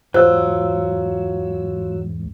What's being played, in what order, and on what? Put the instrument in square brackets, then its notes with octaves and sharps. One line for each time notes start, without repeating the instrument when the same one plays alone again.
[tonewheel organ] E2 G#2 [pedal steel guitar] F#3 E6 [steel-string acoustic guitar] F4 [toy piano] C5